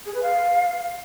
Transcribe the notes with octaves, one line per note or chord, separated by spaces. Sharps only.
G#4
B4
F5